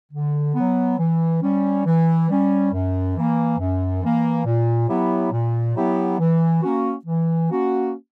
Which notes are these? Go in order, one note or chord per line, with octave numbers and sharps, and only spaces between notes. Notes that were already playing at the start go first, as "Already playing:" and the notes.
D3
F#3 B3
E3
G3 C#4
E3
G3 C#4
F#2
E3 A#3
F#2
E3 A#3
A#2
F#3 B3 E4 G4
A#2
F#3 B3 E4 G4
E3
A#3 C#4 F#4
E3
A#3 C#4 F#4